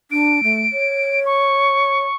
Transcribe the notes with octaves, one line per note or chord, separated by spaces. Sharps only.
D4 D7
A3
C#5
C#6